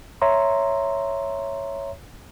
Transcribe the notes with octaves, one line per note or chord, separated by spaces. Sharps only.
C#5 E5 A#5 C6